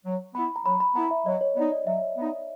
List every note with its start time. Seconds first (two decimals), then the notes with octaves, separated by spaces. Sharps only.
0.05 F#3
0.35 B3 E4 B5
0.56 A#5
0.65 F#3 B5
0.80 B5
0.95 B3 E4 A#5
1.11 E5
1.26 F#3 D#5
1.41 C#5
1.56 B3 D#4 D5
1.72 D#5
1.87 F#3 E5
2.17 B3 D#4